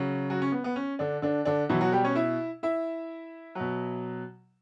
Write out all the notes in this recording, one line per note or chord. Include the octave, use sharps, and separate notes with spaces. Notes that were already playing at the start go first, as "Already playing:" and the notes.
Already playing: C#3 F#3
F#3 F#4
C#4
B3
B3
C#4
D3 D4
D3 D4
D3 D4
B2 E3 F#3 E4
F#3 F#4
G3 G4
C#4 C#5
E4 E5
E4 E5
B2 F#3